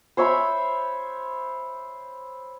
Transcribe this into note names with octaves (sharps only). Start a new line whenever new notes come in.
C5 C#5 E5 B5